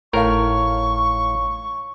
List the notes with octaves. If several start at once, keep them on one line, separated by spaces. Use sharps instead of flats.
G#1 A2 A#4 C#5 F5 C#6